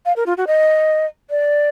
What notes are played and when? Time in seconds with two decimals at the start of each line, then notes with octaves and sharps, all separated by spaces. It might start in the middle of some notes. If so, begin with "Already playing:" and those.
0.06 F5
0.16 A#4
0.26 F4
0.37 F#4
0.47 D#5
1.30 D5